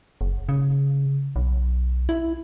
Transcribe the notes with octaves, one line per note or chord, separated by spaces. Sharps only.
F#1
C#3
B1
E4